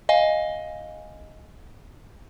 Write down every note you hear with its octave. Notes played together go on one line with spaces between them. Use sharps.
D#5 F5 G#5